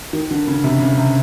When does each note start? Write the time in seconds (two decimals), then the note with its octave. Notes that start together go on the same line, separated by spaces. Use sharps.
0.13 D#3
0.31 D3
0.47 C#3
0.64 C3
0.80 C#3
0.98 C3